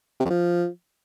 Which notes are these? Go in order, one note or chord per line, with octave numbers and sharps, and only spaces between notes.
C3
F2
F3